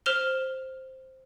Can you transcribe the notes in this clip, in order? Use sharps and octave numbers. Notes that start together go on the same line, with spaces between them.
C5 F6 E7 F7 G7